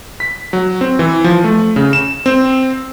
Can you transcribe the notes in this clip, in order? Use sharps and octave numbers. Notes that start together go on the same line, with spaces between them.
B6
F#3
C4
E3
F3
A3
C#3
E7
C4